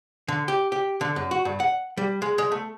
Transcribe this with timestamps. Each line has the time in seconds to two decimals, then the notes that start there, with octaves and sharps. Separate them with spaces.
0.28 D3
0.48 G4
0.72 G4
1.01 D3
1.16 F#2
1.31 F#4
1.45 G2
1.60 F#5
1.97 G3
2.22 G#3
2.38 G#3
2.52 A3